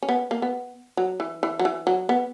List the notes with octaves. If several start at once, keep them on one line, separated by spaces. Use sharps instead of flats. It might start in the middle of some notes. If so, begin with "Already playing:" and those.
C#4
B3
A#3
B3
F#3
E3
E3
F#3
E3
F#3
B3